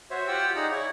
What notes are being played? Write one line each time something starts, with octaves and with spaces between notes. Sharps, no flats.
F#4 C5 C#5 E5
F4 G4 F#5 G5 E6
D#4 G#4 D5 F#5 A#5
E4 C#5